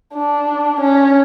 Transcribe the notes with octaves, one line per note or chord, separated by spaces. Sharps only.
D4
C#4